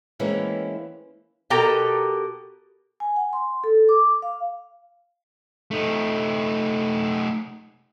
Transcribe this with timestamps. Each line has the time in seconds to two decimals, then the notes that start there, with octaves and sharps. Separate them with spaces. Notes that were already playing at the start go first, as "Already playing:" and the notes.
0.19 E3 G#3 A#3 C4 C#4 E4
1.50 B2 G4 A4 A#4 G5 A#5
3.00 G#5
3.16 F#5
3.33 C6
3.64 A4
3.89 D6
4.22 F5
5.71 A3 D#4